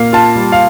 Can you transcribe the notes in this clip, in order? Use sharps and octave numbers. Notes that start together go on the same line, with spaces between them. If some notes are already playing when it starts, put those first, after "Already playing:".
Already playing: A#2 A#3 F5
F4 A5
G3
F5